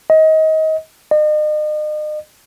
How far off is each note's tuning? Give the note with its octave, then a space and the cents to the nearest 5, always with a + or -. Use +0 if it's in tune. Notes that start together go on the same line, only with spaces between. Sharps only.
D#5 +25
D#5 -40